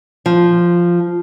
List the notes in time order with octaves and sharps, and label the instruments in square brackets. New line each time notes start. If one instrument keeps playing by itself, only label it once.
[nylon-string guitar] F3